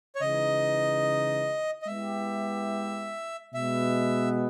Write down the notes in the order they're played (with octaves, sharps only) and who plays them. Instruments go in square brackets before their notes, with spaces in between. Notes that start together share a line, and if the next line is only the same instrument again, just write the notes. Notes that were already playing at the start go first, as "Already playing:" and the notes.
[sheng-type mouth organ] C#5
[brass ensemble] C#3 E3 G#3 D#4 [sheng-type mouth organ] D#5
[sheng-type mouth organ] D#5
[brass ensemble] G#3 B3 E4 G4 [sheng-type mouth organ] E5
[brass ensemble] B2 G#3 B3 [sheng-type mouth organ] E5